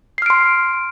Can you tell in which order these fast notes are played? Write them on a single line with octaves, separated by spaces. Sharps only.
C7 F6 D7 C6